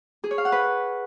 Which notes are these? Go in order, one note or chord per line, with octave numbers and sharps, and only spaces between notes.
G#4
C#5
F5
F#5
B4